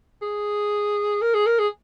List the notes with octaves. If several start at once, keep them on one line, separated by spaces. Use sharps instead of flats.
G#4
A#4
G#4
A#4
G#4